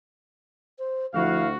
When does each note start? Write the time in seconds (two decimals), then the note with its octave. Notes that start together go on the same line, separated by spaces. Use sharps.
0.79 C5
1.14 D2 F3 E4 F#4 F5